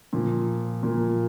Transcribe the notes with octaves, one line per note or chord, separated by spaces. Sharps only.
A#2 F3 A#3
A#2 F3 A#3